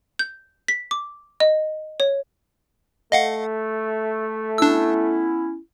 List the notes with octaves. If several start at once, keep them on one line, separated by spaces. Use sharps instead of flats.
G6
B6
D6
D#5
C#5
A3 D#5 F5 F#5
B3 C#4 D4 E4 E6